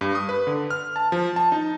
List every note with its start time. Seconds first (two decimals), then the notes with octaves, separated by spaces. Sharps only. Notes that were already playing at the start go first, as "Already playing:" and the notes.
0.01 G2
0.15 D#6
0.29 B4
0.47 D3
0.70 F6
0.96 A5
1.12 F3
1.36 A5
1.52 D#4